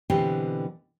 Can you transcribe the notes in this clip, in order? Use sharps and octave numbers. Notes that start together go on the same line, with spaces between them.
B2 D3 E3 C4 G4